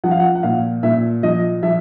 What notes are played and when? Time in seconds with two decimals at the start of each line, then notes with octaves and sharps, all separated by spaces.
0.04 F3 F#5
0.11 F5
0.20 F#5
0.35 F#5
0.43 A#2 F5
0.83 A#2 E5
1.23 F3 D#5
1.63 F3 E5